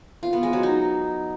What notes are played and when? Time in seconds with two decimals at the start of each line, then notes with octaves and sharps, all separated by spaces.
0.23 F4
0.33 B3
0.43 G#3
0.53 F#3
0.63 D#4